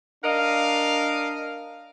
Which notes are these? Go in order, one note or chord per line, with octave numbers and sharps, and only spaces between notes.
D4 A#4 D#5 F5